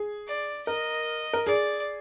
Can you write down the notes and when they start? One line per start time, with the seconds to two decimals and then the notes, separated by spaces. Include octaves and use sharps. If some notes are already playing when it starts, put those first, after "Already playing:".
Already playing: G#4
0.27 D5
0.67 A#4 D#5
1.33 A#4
1.46 G#4 D5